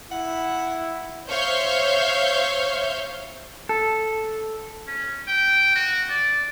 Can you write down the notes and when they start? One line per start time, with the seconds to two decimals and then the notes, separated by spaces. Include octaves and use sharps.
0.11 E4 F#5
1.28 C5 C#5 E5 F5 G6
3.69 A4
4.87 C#4
5.27 G5
5.75 F#4
6.10 D5